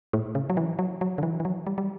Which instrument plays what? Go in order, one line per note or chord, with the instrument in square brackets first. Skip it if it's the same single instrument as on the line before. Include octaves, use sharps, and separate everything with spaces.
[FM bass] A2
C#3
F#3
E3
F#3
F#3
D3
E3
E3
F#3
G3
G3